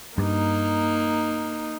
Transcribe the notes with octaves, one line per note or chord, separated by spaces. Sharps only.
G2 A#3 D#4